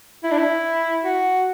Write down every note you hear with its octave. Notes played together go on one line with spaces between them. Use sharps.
E4
D4
E4
F#4